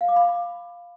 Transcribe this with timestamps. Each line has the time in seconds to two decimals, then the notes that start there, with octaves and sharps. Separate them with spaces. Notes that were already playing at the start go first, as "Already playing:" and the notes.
0.01 F5
0.08 D6
0.16 B5